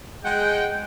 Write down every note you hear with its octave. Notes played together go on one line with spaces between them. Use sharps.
G#3 F#5 G5